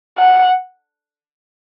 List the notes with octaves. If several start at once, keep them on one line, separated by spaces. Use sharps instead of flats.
F#5